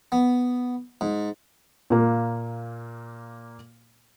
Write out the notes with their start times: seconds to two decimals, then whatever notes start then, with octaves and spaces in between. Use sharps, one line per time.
0.12 B3
1.01 G#2
1.90 A#2 A#3